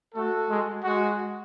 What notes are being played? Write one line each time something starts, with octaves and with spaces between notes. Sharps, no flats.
A3 F#4 A4
G#3
G#3 F#4